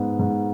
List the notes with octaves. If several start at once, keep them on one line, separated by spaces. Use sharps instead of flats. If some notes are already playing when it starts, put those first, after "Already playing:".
Already playing: G#2 B3
G#2